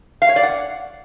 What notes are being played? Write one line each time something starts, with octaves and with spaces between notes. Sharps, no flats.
F5
C#5
D5
F#5